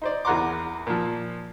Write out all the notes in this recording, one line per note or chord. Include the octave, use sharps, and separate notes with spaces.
D#4 C5 D5
E2 A#4 F#5 A#5 C6 D6
A#2 F3